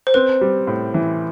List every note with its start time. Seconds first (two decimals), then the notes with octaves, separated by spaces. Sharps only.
0.07 C5
0.14 C4 B4
0.41 G3
0.67 A2
0.94 E3